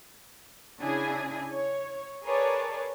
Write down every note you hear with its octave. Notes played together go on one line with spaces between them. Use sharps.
C#3 D4 E4 G#4 G#5
C#5
G#4 A#4 B4 C#5 D5 A5